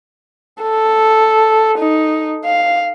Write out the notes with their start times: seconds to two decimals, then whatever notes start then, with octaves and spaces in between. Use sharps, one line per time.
0.62 A4
1.78 D#4
2.45 F5